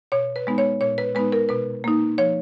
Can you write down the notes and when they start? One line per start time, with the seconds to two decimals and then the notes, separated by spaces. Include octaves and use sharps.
0.12 B2 C#5
0.36 B4
0.47 G#3 B3 D#4
0.58 C#5
0.81 A#2 C#5
0.98 B4
1.15 G#3 B3 D#4 B4
1.32 A#4
1.49 B2 B4
1.84 A#3 D#4
2.18 F3 C#5